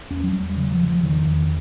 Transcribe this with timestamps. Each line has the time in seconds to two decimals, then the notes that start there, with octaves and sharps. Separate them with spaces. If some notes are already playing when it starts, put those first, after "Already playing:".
0.10 E2 C#4
0.24 F#3
0.33 E2 G3
0.57 C#3 F#3
0.72 F3
0.81 C#3
0.88 F3
1.03 E2 D#3
1.27 E2